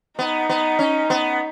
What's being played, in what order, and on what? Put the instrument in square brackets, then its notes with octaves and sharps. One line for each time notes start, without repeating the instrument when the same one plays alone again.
[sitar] B3 [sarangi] D#4
[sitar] B3
C#4
B3